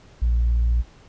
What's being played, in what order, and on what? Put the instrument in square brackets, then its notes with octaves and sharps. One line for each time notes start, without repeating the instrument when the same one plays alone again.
[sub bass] A#1